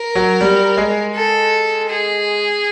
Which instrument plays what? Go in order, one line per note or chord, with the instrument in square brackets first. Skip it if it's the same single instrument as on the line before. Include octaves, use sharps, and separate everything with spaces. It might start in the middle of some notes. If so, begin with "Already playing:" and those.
Already playing: [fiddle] A#4
[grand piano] F#3
G3
G#3
[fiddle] A4
G#4